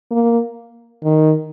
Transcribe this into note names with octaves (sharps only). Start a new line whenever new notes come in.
A#3
D#3